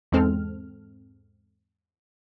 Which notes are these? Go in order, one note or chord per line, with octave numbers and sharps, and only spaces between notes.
E2 G#2 G#3 C4 A4 F6